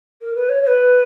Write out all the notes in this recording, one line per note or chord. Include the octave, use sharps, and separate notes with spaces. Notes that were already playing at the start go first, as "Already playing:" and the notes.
A#4
B4
C#5
C#5
B4